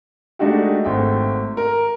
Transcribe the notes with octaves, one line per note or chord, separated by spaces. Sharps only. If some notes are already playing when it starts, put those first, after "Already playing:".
G#3 A3 D4 D#4 F#4 G4
G#1 A3 G5
A#4